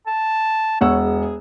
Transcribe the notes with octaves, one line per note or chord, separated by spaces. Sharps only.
A5
E1 C#5 F#5 E6
G#4
G#4